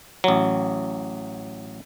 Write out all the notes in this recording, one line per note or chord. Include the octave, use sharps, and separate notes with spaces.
A1 F#3